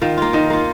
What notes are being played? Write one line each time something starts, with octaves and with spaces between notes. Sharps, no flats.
D#3 F4 F5
A#3 F4
D#3 D#4
A#3 F4